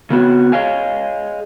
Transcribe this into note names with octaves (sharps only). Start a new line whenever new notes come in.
C#3 B3 F#4 C#5
G#4 C#5 D#5 F5 G#5